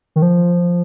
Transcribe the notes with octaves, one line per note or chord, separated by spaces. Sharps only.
D#3
F3